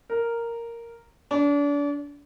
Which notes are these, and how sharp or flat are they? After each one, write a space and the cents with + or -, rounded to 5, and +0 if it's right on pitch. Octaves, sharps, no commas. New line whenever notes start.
A#4 -5
D4 -35